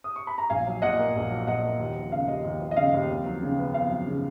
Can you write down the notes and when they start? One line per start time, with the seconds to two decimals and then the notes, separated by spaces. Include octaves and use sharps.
0.04 D#6
0.16 C#6
0.27 B5
0.38 A#5
0.50 A#1 F5 G#5
0.66 F#3
0.82 A#2 D#5 F#5
0.98 A#3
1.15 A#1
1.31 F#3
1.47 A#2 D#5 F#5
1.63 A#3
1.79 D#2
1.96 F3
2.12 C#3 F5
2.28 D#2 D#5
2.45 D#2
2.61 F3
2.71 D#5
2.77 C#3 F5
2.94 D#2
3.09 F2
3.26 F#3
3.42 C#3
3.59 B3
3.74 F2 F5
3.91 F#3
4.07 C#3